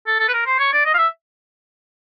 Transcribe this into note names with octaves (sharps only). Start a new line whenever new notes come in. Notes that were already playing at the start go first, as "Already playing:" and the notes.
A4
A4
B4
A#4
C5
C#5
D5
D#5
F5
E5